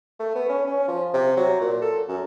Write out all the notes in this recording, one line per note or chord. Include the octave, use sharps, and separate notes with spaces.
A3
B3
C#4
C#4
F3
C3
F#3
A#2
A4
F#2